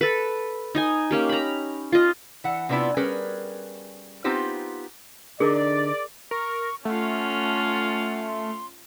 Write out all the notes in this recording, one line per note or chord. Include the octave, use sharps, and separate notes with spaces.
A4 B4
D#4 D#5 G#5
A#3 C#4 G4
A#5 B5
F4 D#5
E3 F#5
C3 F#3 B3 D4 E4 F4
G3 C#4 G#4 A#4 B4
B3 C4 D#4 F4 G4 C5
D3 D4 D#4 G#4 A#4 D5 D6
A#4 C#6
A3 C#4 F4 F#5
C6